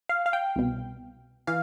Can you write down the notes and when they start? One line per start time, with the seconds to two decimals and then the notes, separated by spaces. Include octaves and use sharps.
0.09 F5
0.26 F5
0.33 G5
0.56 C2 B2
1.47 E3 F5